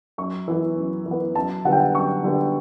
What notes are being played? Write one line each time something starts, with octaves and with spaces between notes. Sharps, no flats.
F#2 C#6
E3 B3
F#2
E3
B3
F#2 A5
D3 G3 B3 F#5
G5
F#5
F#2 C#6
D3 G3 B3